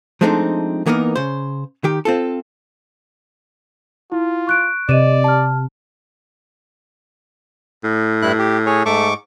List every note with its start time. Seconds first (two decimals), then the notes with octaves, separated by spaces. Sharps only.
0.21 F3 G#3 A3 C4 D4 D#4
0.86 E3 A#3 B3 D#4 A#4
1.16 C#3 C5
1.84 D#3 G4
2.05 C4 F4 A4
4.12 E4 F4
4.47 C#6 F#6 D7
4.89 C3 D5 D#5 D#7 E7
5.24 A5 F6
7.84 A2
8.22 G2 E4 F#6
8.39 G4
8.66 G#4 C#5
8.86 G#2 A3 C#6 D6